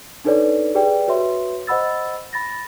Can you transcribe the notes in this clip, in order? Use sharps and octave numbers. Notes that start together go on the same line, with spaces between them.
D4 D#4 A4 B4 C#5 D5
G4 G#4 B4 D5 G5
F#4 B4 C#5 E5 C6
C5 D#5 F#5 B5 E6 A6
B5 A6 A#6